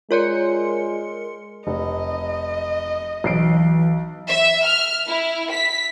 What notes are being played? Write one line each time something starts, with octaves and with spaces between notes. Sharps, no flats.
G#3 F4 A#4 C#5 D5 C6 C#7
F1 D#5
B1 E3 C7 D7
E5
F6
E4
B6